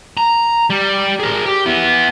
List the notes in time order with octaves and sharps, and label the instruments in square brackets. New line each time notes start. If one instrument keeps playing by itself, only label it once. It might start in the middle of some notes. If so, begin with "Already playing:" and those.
[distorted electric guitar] A#5
G3
G#4 A#4
G4
B3 E4